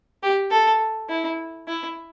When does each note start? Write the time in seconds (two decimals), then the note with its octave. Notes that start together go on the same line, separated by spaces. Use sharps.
0.23 G4
0.51 A4
1.09 E4
1.68 E4